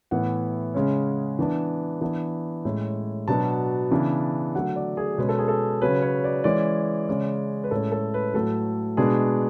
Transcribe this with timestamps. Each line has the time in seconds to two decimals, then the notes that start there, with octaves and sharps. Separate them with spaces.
0.11 A2 E3 B3 F#5
0.74 C#3 G#3 C#4
1.39 E3 B3 D4
2.01 E3 B3 D4
2.65 A2 G#3 C#4
3.28 B2 F#3 B3 D4 A5
3.91 C#3 E3 B3 D4
4.55 D3 F#3 A3 F#5
4.76 D5
4.97 G#4
5.18 B2 G#3 C#4 B4
5.29 A4
5.39 G#4
5.48 A4
5.82 C#3 F#3 C#4 B4
6.02 C#5
6.24 D5
6.44 E3 G#3 C#4 D5
7.08 C#3 G#3 C#4
7.64 B4
7.71 A2 G#3 C#4 A4
7.92 A4
8.14 B4
8.34 A2 F#3 A3 A4
8.97 B2 G#3 B3 D4 G#4